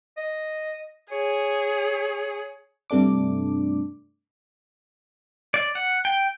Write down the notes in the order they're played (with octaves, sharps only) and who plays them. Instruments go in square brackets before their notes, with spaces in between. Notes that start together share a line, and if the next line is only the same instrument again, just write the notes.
[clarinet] D#5
[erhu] G#4 [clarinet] C#5
[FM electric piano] G2 C3 A3 D4 D6
[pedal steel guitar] D5
F#5
G5